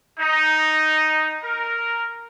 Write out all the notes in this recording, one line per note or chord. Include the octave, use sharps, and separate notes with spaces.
D#4
A#4